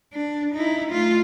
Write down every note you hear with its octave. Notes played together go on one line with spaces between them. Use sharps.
D4
D#4 E4
A3 F4